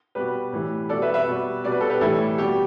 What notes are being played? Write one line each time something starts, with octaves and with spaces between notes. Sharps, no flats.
B2 G3 G4 B4
A2 E3 G3
B2 G3 A4 D5
B4 E5
B4 E5
B2 G3
B2 G3 D5
B4
A4
G4 B4
A2 E3 G3 E4 A4
B2 G3 G4